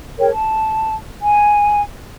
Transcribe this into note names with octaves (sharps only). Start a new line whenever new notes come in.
G#4 A#4 C#5 G5
A5
G#5